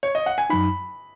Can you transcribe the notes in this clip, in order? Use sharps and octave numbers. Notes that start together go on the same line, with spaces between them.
C#5
D#5
F#5
G#5
F#2 F#3 D#4 B5